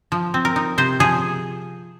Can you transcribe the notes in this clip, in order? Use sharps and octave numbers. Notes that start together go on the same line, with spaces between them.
F3
C4
A#4
D#4
C3 C5
F3 G#4